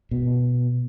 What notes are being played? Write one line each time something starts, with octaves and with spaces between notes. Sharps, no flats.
B2